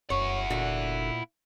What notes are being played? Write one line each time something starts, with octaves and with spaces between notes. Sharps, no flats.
F1 F#2 E4 C#5 F#5
A#2 D3 F#4